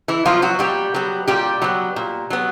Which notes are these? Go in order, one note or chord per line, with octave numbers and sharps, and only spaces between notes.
E3 E4
F3 F#3 B3 F4
F#3 F#4
A#2 G3 G4
F#3 B3
A#2 G3 G4
F#3 B3
A#2
F#3 B3